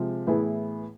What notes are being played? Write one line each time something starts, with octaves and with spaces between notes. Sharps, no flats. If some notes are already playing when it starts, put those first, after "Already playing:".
Already playing: C3 F3 G#3
A2 E3 B3 E4 G#4